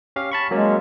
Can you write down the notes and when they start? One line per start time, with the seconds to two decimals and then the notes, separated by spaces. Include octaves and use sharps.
0.16 C#4 G4 F5
0.32 A5 B5 C#6
0.51 F#3 G#3 A#3 C#4